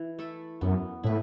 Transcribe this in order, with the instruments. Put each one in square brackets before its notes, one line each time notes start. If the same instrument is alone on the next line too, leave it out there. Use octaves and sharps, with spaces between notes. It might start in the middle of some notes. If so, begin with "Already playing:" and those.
Already playing: [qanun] E3
A3 E4 A4
[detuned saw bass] F#2 [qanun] B3
[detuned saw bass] A2 [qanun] E4 B4